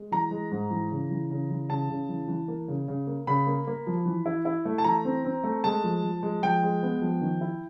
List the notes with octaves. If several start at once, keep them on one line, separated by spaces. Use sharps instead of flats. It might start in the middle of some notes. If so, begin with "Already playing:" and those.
Already playing: G#3
E3 A#5
G#3
G#2
E3
C#3
E3
C#3
E3
C#3 A5
C#3
E3
E3
A#3
C#3
C#3
A#3
C#3 B5
A#3
A#3
F3
E3
E4
E4
A3
A5
E3 A#5
C4
C4
A3
G#3 A5
F3
F3
G#3
F3 G5
G#3
B3
F3
D#3
E4